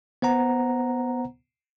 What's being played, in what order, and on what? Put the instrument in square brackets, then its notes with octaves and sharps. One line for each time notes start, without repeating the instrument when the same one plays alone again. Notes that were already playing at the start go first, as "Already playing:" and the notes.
[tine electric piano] B3 C5 F#5 A#5